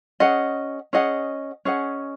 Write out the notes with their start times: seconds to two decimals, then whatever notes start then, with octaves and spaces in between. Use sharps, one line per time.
0.20 C#4 G#4 D#5 F#5
0.93 C#4 G#4 D#5 F#5
1.65 C#4 G#4 D#5 F#5